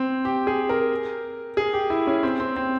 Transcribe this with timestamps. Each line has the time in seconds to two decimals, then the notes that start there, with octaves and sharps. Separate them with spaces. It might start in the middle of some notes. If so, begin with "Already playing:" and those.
Already playing: C4
0.25 G4
0.47 G#4
0.69 A#4
1.57 G#4
1.73 G4
1.90 E4
2.07 C#4
2.23 C4
2.40 C4
2.56 C4